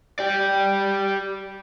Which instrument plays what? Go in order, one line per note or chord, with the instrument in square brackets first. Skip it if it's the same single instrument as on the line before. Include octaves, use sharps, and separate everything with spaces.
[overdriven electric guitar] G4 D5